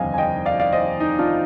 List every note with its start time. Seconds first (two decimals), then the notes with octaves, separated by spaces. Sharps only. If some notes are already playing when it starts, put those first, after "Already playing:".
Already playing: F1 D#2 D3 G3 C4 D#5 F5 G#5
0.14 G#5
0.18 D#5 G5
0.46 D5 F5
0.60 D5 F5
0.73 C5 D#5
1.00 D#4
1.19 D4 F4